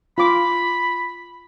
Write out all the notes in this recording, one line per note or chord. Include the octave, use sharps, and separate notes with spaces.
F4 B5 D6